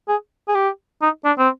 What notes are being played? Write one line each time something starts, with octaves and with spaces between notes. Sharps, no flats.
G#4
G#4
G4
D#4
D4
C4